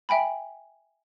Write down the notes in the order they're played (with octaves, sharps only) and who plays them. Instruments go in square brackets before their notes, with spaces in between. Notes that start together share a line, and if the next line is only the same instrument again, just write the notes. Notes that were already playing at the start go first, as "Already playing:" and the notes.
[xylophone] E5 G5 G#5 B5